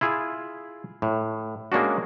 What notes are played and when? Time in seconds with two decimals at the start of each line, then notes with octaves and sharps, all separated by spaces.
0.01 E4 F4 G#4
1.02 A2
1.72 G#3 A#3 C#4 D4 F#4